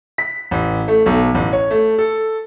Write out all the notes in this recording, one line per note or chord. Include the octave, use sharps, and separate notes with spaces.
B6
A1
A3
B1
A1
C#5
A3
A4